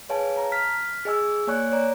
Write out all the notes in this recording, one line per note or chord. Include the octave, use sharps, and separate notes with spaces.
G#4 B4 C#5 F5 G#5 A5
A5 A#5
F6 B6
G#4 D#5 G#5 E6
A#3 C#5 D5 G#5 C#6 F#6
C#5 D5 A#5